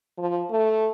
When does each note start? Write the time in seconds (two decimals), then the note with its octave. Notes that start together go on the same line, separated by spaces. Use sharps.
0.18 F3
0.51 A3